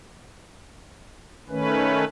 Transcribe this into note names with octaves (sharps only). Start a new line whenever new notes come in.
D#3 A3 C#4 B4